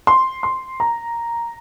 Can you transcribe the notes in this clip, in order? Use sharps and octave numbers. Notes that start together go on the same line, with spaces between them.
C6
C6
A#5